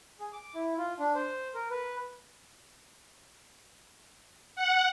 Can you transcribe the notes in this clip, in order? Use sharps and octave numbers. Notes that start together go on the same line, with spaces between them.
G#4
D6
E4
F4
D4
C5
A#4
B4
F#5